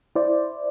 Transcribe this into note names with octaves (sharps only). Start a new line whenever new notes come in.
E4 C5 D5